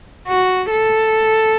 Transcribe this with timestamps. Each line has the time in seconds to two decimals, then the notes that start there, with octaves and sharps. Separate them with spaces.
0.27 F#4
0.71 A4